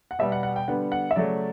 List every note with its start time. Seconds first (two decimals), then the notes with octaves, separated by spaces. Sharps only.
0.11 F#5
0.19 B2 G3 B3 E5
0.32 F#5
0.43 F#5
0.56 G5
0.68 D3 G3 B3 F#5
0.92 F#5
1.11 E5
1.16 C#3 F#3 A3 D5